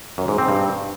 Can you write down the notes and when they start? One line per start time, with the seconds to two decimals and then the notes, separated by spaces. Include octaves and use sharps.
0.18 F#2
0.28 G#2
0.38 C4
0.49 G2